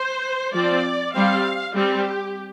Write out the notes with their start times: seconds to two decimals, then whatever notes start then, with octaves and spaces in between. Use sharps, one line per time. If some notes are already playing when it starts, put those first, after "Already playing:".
Already playing: C5
0.53 F3 C4 D5
1.13 G3 C4 F5
1.74 G3 C4 G4